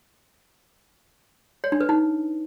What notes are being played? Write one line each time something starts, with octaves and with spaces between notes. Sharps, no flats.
C#5
D4
B4
D#4